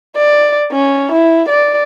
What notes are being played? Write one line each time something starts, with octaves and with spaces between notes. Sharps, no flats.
D5
C#4
E4
D5